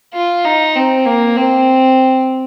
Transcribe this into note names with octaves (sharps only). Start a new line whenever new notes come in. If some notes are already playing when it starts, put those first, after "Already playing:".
F4
D#4
C4
A#3
C4